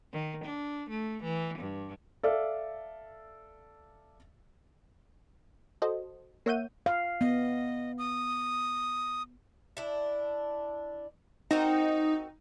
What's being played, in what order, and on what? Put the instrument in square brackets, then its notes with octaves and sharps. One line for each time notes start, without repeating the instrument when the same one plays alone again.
[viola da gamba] D#3
D4
A3
E3
G2
[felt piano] A4 D5 E5 F5
[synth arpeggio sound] F#4 A4 C5 D#5
A#3 C#5 E5 F#5 G6 D#7
[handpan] F5
[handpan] B3 [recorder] D#5
[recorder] D#6
[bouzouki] D4 E4
[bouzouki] C4 F#4 A#4 [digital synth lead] D#4